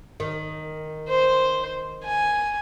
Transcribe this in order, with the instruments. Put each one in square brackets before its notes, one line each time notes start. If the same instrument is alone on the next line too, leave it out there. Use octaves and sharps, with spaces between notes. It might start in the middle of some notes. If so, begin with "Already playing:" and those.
[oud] D#3
[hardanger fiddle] C5
G#5